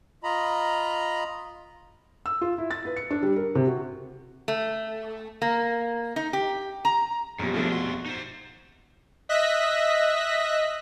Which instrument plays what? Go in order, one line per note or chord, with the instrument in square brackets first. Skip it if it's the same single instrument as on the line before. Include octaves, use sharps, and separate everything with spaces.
[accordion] F4 D#5 A#5 B5
[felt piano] E6
F4
E4
A6
B4
C#7
D4
G3
A#4
C3
F#4
[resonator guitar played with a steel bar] A3
A#3
D#4
G4
A#5
[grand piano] A#1 B2 G3 [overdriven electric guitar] F#2
[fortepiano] F3 A3 [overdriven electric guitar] F#3 D4
[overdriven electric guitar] F2 C6 [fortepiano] F#4
[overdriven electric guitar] D#4 C5
[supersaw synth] D#5 E5 F#6 A#6 B6